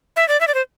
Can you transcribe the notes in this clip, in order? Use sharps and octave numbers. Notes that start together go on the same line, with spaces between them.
E5
D5
E5
D5
C5